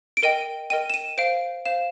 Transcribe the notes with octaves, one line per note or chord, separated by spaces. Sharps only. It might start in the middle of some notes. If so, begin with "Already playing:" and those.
D7
A#4 D#5 G5 D#7
A#4 D#5 G5 D#7
E7
D#7
C5 F5 D7
C5 F5 E7